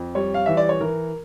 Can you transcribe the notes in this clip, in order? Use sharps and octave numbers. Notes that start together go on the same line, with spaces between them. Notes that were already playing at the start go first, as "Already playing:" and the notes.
Already playing: F2
G3 C#5
F5
E3 E5
D5
C#5
E3 A#4